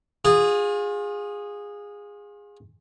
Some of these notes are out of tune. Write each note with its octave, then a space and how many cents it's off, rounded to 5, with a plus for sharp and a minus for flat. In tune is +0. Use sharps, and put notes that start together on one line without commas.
F4 +35 G#4 -15